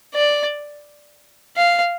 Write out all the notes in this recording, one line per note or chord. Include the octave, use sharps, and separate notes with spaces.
D5
F5